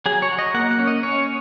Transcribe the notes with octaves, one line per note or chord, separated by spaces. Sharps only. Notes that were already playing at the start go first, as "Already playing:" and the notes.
F#3 G#4
C#5
F#3
D#5
A#3 F#5
F#5
C#4
D#5
C#4 C#5